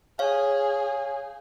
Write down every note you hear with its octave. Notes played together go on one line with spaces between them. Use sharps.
G#4 C#5 F5